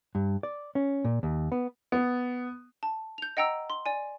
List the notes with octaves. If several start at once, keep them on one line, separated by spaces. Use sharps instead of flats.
G2
D5
C#4
A#2
D#2
B3
B3
A5
G6 F7
D#5 F#5 G5 A#5 E6
C6
D5 G#5